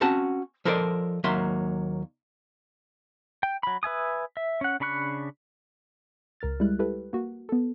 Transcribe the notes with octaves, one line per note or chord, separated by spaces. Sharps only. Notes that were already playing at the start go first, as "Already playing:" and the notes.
C4 C#4 F#4 F#5 A5
F3 A4 A#4 C5 D5 D#5
D#2 F#3 A#3 E5 C6
G5
F#3 B5
B4 E5 G#5 D#6
E5
C#4 F#5
C#3 D4 B5 C#6 F#6
C#2 A#4 F6 A6
G3 G#3 E4 F#6
E4 G4 A4 B4
A#3 F#4
B3 A4